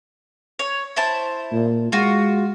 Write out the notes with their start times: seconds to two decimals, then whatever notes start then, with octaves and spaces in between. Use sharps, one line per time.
0.59 C#5
0.96 E4 C5 A5
1.52 A#2
1.92 G#3 F4 F#4